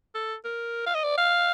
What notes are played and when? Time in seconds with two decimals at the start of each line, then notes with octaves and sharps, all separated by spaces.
0.15 A4
0.45 A#4
0.86 F5
0.95 D#5
1.03 D5
1.17 F5